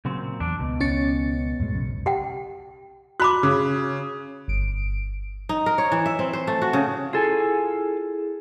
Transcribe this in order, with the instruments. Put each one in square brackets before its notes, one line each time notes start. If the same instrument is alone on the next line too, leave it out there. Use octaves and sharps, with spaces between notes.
[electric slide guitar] A#2 F#3 C4 [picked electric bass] C#3
[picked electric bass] E2 [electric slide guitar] D4
[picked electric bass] C#2 [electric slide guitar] B2
[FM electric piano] C#4 A6 C#7
[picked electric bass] F2 A2 G#3
B1 F#2 C#3
[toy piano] G4 F#5 G5
[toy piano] F#4 B5 D6 [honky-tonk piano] F#6
[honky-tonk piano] C#3
[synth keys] G1 D7
[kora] D#4
A#4
C#5
E3
E5
C4
C5
A3
F#4
C#3
[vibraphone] E4 G#4 [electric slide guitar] F4 A4 G#5